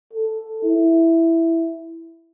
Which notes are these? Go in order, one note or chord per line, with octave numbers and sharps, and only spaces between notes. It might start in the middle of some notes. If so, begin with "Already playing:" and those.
A4
E4